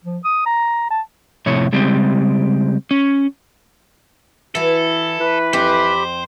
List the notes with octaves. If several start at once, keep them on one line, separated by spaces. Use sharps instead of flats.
F3
D#6
A#5
A5
F2 A2 C3 C#5
C#3 G3 G#3 C4
C#4
E3 E4 F#4 A4
E3 B4
F2 C4 G4 C5 B5